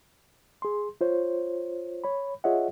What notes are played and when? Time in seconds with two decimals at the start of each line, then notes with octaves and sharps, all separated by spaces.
0.62 G#4 C6
1.01 F4 C5 C#5
2.04 C#5 B5
2.44 F4 G#4 C#5 D#5 E5 F#5